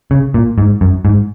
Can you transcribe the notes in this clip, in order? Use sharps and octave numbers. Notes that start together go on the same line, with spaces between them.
C#3
A#2
G#2
F#2
G#2